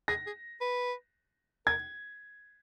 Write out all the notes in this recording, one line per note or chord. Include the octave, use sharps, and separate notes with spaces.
G#4 A#6
G#4
B4
A#4 G#6